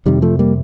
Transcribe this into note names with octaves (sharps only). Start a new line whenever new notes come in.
F2 C3 D#3 G3
F3 A3
G3 A#3